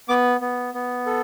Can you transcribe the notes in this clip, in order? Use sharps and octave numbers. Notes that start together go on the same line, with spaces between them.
B3 D6
B3
B3
A4